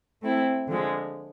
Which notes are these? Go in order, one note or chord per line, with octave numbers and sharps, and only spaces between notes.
A3 C4 E4
D3 F3 G#3